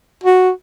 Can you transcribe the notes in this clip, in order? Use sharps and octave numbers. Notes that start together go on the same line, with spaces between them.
F#4